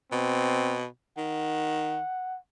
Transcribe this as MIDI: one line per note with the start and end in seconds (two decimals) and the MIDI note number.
0.12 0.85 47
0.12 0.80 60
1.18 2.00 51
1.18 2.38 78